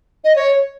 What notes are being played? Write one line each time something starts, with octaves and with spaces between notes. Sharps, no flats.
D#5
C#5